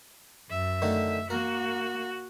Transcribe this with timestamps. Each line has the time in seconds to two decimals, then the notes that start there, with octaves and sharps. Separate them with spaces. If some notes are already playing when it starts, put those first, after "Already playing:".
0.50 F#2 E5
0.82 D3 D#3 A3
1.30 A#3 F#4 A#4